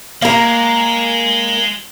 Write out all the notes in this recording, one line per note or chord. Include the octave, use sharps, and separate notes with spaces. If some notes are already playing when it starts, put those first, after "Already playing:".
G#3 A#3 A#4